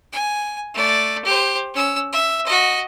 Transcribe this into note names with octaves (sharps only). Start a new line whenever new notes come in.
G#5
A3 D5
G4 C5
C#4 E6
E5
F#4 D#5